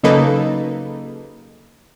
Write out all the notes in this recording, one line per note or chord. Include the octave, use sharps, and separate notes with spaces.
C#3 F#3 A#3 D#4 A4 B4